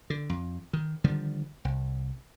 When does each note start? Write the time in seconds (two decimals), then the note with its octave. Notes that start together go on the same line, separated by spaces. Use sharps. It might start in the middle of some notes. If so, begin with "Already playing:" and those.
0.10 D3
0.30 F2
0.73 D#3
1.04 D3 D#3 F3 G3
1.65 C2